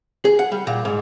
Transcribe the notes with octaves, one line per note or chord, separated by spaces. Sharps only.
G#4
F#5
G3
A#2
G#2